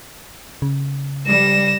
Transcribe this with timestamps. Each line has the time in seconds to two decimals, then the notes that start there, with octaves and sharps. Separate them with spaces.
0.62 C#3
1.27 G3 A#6 E7